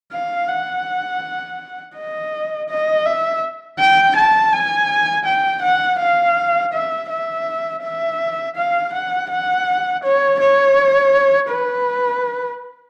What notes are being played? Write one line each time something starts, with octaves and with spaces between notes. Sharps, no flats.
F5
F#5
D#5
D#5
E5
G5
A5
G#5
G5
F#5
F5
E5
E5
E5
F5
F#5
F#5
C#5
C#5
B4